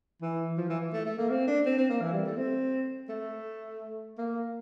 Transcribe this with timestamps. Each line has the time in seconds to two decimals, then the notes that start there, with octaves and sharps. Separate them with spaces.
0.21 E3
0.57 F3
0.69 E3
0.93 A3
1.05 A3
1.18 A#3
1.30 C4
1.47 D4
1.66 C4
1.78 C4
1.89 A#3
2.01 E3
2.13 G3
2.26 A3
2.37 C4
3.09 A3
4.18 A#3